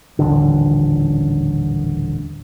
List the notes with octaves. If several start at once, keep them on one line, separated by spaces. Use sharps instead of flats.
D#1 A1 D3